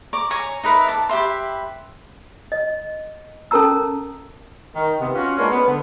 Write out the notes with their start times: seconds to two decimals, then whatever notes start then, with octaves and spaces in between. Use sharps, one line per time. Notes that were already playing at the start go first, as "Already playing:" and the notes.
0.13 D5 A#5 C#6 D6
0.30 C#5 G#5 A#5
0.64 D#4 A#4 B4 E5
0.86 D5 A5
1.09 G4 B4 E5 C6
2.52 D#5
3.51 C#4 A4 A#4 A5 A#5 E6
4.75 D#3
5.00 C3 B3
5.15 C#4 F4 F#4
5.38 G#3 A#3 B3 C#4 D4 F4
5.51 B3
5.66 D3 B3